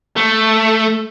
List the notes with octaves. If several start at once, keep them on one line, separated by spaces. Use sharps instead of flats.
A3